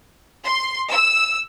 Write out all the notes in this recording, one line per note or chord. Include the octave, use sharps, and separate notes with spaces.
C6
E6